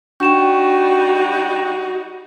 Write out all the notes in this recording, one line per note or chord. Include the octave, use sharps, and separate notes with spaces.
G3 D4 D#4 F#4 G5 C#6 E7